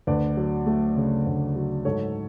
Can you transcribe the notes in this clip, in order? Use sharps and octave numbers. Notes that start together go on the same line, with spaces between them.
D2 B4 D5
F#3
A3
C#3
D2
F#3
G#2 A4 C#5